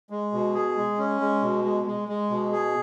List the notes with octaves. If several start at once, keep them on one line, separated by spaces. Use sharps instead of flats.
G#3
B2
G#4
G#3
C#4
G#3
B2
G#3
G#3
G#3
B2
G#4